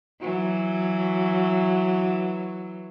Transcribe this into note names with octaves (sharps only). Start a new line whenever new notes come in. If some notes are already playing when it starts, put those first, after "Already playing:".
E3 F#3